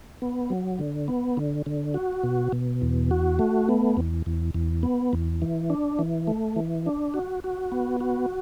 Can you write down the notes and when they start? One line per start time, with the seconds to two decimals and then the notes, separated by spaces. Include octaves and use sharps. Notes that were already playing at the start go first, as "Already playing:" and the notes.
0.22 B3
0.50 F#3
0.79 D3
1.08 B3
1.37 D3
1.66 D3
1.94 F#4
2.23 B2
2.52 B2
2.82 E2
3.11 F#4
3.39 A3
3.69 B3
3.97 E2
4.26 E2
4.54 E2
4.83 B3
5.13 E2
5.42 E3
5.70 D4
5.99 E3
6.27 A3
6.56 E3
6.86 D4
7.14 F#4
7.44 F#4
7.72 B3
8.01 F#4